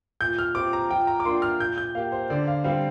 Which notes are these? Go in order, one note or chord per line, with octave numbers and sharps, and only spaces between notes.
A#2 G6
F6
F3 C4 G4 D6
A#5
F3 G5
A#5
D6
A#3 D4 F4 C6
F6
A#2 G6
G6
A#3 G4 F5
C5
D3 D5
F5
G3 C4 F5